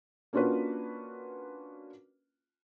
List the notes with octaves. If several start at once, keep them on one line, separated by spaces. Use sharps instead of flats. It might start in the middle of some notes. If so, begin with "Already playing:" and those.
A#3 C#4 D4 F4 F#4 B4